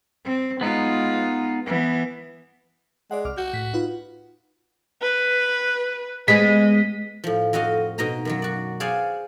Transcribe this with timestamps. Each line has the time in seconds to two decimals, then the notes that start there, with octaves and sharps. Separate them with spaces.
0.25 C4
0.61 G#3 B3 D#4 F4
1.66 E3 B3
3.11 G#3 D5 F#5
3.25 C2 D6 F6
3.37 F#4 G6
3.53 A2 B6
3.74 D#4 F4 B4
5.02 B4
6.28 G#3 B3 G#4 D#5 B6
7.24 A2 F3
7.53 F2 C4 F#4 D#5 F5
7.98 B2 D#4 D#5 A#5 C6
8.25 F#2 D#3 F#3
8.42 F#4 D5
8.80 G#4 C5 D5 F5 F#5 G#5